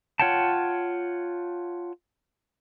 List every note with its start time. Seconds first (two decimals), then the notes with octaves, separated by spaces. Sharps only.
0.20 F4 C#5 F#5 G5 A5